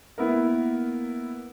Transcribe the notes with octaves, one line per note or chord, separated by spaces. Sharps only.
A#3 B3 E4 A#4